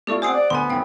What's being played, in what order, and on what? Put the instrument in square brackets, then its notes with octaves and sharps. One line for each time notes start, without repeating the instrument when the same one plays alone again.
[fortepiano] A3 E4 F4 [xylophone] G4 D5 C#6
[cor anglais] C4 [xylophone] C5 D#6 C7 [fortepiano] F#5 G#5
[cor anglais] D5
[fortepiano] D2 [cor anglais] B3 [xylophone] G#5 C6
[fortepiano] G#1 F#2 [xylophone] F5 G5